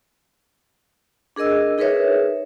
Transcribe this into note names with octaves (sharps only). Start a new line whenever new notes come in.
D4 G#4 A#4 D#5 E6
D#4 G#4 A#4 B4 C#5 E5